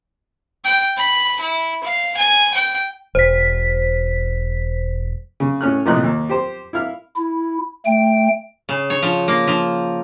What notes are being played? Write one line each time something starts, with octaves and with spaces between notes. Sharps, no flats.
G5
B5
E4
F5
G#5
G5
E1 C5 B6
C#3
A2 C#4 F6 F#6
A#1 A2 C3 D#5 F#6
D#2
G4 C5
E4 F5 F6
E4
A3 G5
C#3
C#5
F3
A#3
F3